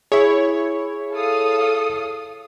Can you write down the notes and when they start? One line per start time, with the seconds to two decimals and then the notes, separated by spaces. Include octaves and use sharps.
0.12 E4 G#4 C#5
1.13 A4 F5 D#6